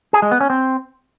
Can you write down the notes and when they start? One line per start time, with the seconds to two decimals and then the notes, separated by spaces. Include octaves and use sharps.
0.13 G#4
0.22 G#3
0.31 B3
0.41 C#4
0.50 C4